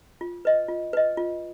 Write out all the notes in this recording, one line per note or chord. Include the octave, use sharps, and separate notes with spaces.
F4
B4 D#5
F4
B4 D#5
F4